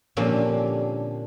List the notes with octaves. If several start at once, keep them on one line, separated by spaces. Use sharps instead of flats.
A#2 D3 F3 C4 C#4 G4